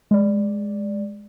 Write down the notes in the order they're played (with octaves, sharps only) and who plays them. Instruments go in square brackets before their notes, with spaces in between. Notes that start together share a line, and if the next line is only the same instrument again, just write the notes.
[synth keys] G#3 D5